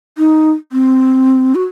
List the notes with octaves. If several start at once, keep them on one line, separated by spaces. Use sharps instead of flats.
D#4
C4
F#4